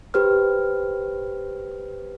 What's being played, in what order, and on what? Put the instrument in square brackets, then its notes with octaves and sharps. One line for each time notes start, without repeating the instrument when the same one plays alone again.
[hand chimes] G4 B4 C5 F6